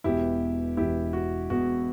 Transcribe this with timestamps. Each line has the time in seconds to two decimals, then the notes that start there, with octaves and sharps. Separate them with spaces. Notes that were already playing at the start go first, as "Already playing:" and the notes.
0.04 E1 E2 B2 E4 G4
0.77 E1 E2 B2 E4 G4
1.13 F#4
1.50 E1 E2 B2 F#4